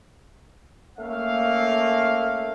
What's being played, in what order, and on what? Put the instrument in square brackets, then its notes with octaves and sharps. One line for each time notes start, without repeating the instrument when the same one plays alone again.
[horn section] A3 A#3 C#4 F5